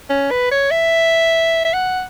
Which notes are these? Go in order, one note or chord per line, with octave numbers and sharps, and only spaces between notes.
C#4
B4
C#5
E5
E5
F#5